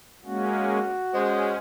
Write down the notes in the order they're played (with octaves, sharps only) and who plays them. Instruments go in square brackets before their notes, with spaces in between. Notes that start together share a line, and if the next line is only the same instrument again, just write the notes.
[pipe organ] G#3 A#3 C#4 [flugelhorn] F#4
[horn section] G#3 [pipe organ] C#4 [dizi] C5